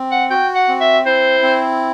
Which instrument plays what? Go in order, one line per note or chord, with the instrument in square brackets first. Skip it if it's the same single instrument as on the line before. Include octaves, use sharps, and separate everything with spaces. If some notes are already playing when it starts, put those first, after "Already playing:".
Already playing: [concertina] C4
[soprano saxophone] F#5
[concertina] F#4 [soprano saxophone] G5
[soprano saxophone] F#5
[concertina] C4
[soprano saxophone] E5
[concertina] E4 [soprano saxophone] C5
[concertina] C4